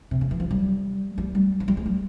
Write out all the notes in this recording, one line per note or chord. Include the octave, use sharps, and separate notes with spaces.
C3
C#3
E3
F3
G3
G3
G3
F3
G3
G#3
G3